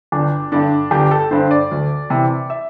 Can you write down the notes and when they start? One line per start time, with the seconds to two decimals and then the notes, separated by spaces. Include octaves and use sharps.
0.12 G1 D4
0.52 G2 D3 D4
0.91 G1 G4
1.11 A4
1.31 G2 D3 C5
1.51 D5
1.71 D2
2.10 C3 E3
2.50 E5